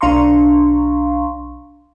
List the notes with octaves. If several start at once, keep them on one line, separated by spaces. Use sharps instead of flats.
B1 D4 F5 A#5 C6 C#6